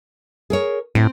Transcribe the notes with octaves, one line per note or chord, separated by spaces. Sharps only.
G#4 A#4 C#5
A2 C4